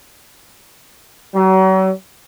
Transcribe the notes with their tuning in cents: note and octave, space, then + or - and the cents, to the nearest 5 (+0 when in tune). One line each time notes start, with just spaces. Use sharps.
F#3 +40